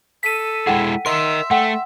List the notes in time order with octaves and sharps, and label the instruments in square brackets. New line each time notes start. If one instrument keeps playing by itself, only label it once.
[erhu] A4 [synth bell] B6 D#7
[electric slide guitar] G#3 E4 G#4 [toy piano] F#5 G5
[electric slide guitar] A#4 D#5 [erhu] E5 [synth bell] C6
[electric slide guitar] A3 [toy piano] F#5 G5